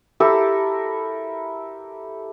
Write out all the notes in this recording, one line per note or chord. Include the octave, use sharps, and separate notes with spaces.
E4 G4 A4 A#4